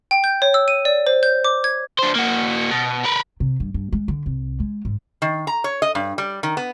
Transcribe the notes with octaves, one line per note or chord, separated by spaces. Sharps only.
G5
G6
C#5
E6
D#7
D5
C5
G6
D6
G#6
D4 C5
A#3 F#4
B2
A#4 B4
C3
G2
G2
G#3
D3
C2
G#3
G#2
D#3
A#5
C#5
D#5
G2
G3
D#3
B3